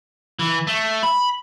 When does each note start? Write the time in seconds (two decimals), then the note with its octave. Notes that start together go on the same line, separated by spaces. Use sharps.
0.39 E3
0.67 A3
1.03 B5